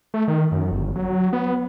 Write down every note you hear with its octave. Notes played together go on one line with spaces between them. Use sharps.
A3
D#3
F#2
G1
F#3
B3